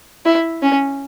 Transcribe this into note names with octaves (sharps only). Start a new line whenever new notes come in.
E4
C#4